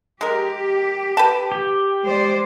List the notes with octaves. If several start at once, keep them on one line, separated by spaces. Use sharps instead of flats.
G#3 G4 A#4
B4 G5 A5
G4
G#3 C5 D5